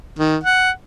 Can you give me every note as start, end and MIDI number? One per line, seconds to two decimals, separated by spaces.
0.19 0.36 51
0.43 0.70 78